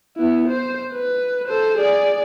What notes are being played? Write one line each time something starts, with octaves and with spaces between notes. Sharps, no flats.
B3 E4
C5
B4
A4 C5
G#4 D5